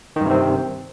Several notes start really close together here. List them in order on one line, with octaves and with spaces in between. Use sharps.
D#3 G2 C3 C4